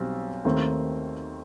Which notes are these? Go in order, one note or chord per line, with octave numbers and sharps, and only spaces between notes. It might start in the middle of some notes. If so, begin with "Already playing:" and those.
Already playing: B1 B2 G3 C4
D#2 D#3 A3 C4